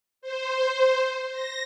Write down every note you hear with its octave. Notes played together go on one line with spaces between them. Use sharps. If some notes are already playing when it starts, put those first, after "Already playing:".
C5
A#6